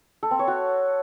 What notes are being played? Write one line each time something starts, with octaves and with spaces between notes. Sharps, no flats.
A4
C4
C#5
F#4